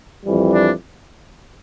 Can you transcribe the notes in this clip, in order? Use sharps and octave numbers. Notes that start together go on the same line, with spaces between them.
F2 E3 G3
D4